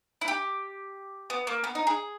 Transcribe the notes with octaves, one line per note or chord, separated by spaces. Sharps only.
E4
G4
B3
A#3
B3
D#4
G#4